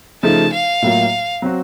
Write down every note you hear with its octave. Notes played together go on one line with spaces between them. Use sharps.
C#3 F3 A3 D#4 A5
F5
A2 F#3 A#3 F4
F#3 C4 F#4